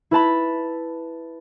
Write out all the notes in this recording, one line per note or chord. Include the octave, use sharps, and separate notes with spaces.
E4 B4 A5 B5